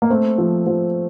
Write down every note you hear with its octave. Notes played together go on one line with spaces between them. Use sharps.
A#3
A3 C4
F3
F3